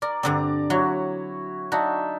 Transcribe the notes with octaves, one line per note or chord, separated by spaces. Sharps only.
A#4 D5
G2 D3 C4 D5 A#5
F#3 E4 F#4 C#5
D4 D#4 F#4 E5